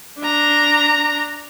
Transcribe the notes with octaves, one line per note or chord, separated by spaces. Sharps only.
D4 A#5